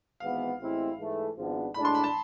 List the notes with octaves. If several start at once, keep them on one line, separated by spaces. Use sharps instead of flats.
G#1 G#2 E3 B3 F5
A1 A2 G#3 C4 E4
G#2 E3 A3
G#1 G#2 F3 B3 D4
A2 G#3 D4 B5
C6
B5
A5